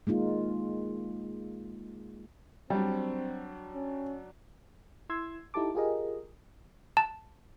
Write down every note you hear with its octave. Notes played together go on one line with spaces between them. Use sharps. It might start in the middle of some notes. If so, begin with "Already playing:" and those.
G#3 A#3 D#4 F4
F#3 G3 C4 D4
C#4
E4 C6 E6 G#6
D#4 E4 G4 A4 A5 D6
F4 G4 G#4 A#4 D#5
A5